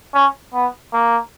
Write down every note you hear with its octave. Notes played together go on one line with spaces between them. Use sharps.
C#4
B3
A#3